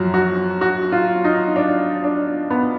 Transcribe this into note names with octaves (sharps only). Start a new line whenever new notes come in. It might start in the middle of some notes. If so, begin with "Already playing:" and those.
Already playing: F#2 F3 F#4
F#4
F#4
F4
D#4
D4
D4
B3